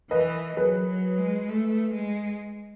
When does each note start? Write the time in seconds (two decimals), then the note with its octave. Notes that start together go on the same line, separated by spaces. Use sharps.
0.11 E3 B4 D#5
0.57 F#3 G#4 B4
0.87 F#3
1.18 G#3
1.49 A3
1.94 G#3